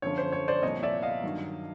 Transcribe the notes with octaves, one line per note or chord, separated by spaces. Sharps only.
F#2 D3 F3 C#5
C5
C#5
C5 D5
C2 A#2 F3 C#5 D#5
D5 E5
D#5 F5
G2 D#3 F#3